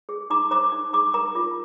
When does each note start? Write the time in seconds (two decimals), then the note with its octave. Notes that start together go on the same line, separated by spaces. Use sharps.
0.09 G#4
0.30 D#4 A#5 D6
0.51 C5 A#5 D6
0.72 D#4
0.93 G#4 A#5 D6
1.14 A#4 A#5 D6
1.35 F4